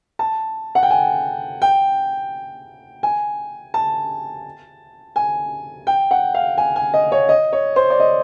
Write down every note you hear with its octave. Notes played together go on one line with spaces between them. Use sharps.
A5
F#5
G5
G#5
G5
G#5
A5
G#5
G5
F#5
F5
G#5
G#5
D#5
C#5
D#5
C#5
C5
D5
D#5